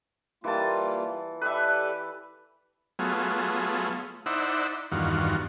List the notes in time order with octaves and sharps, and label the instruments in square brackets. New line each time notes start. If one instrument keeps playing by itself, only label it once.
[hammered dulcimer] E3 A5 [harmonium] G3 A#3 F4
[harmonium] G4 A4 D5 [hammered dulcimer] B4 E5
[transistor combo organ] F#3 A3 B3 F4 G#4
D#4 E4 C5 D5 E5 F#5
E2 G2 D#3 F4 F#4